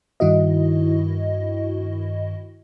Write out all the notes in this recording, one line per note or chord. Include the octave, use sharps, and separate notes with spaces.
G2 D#3 E4 F#4 D#5